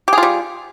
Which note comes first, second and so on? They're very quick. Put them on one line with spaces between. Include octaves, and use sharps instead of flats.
G4 G#4 F4 G3